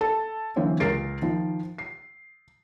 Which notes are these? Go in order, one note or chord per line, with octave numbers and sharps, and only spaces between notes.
A4
D3 E3 F#3 A#3 C4 C#4
C#2 G#4 A#4 A6 C7 D7
D#3 F3 F4
C7